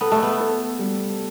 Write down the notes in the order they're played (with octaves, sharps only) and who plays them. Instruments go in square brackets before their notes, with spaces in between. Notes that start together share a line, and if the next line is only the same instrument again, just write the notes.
[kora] B3 [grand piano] A4
[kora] A3
B3
[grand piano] A4
G3